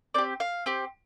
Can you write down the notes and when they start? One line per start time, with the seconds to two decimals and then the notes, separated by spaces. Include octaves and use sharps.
0.14 C4 G4 D5
0.40 F5
0.66 C4 G4